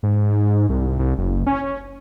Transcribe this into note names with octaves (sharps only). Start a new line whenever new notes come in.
G#2
C2
C2
F#1
C#4